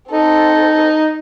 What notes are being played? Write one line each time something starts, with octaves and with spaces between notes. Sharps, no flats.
C4 D#4 A4